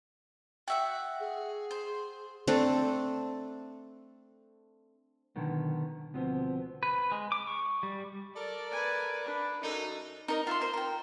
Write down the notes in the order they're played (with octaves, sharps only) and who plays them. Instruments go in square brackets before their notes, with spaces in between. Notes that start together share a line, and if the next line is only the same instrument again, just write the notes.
[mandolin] F#4 E5 F#5 [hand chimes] G5
[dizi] G#4
[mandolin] C5
[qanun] A3 C4 D4 A4
[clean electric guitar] B2 D3 D#3 F#3 B3
D2 B2 F3 B3 C4
[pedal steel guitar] B4
G#3
D6
C#6
G3
[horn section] A4 A#4 D5
[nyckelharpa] B4 G#5
D4 B5
[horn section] F#2 D#4 [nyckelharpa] A4
[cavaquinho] D#4 A#4 D#5
F4 E5 C6
F4 A#4 C5
A#4 G5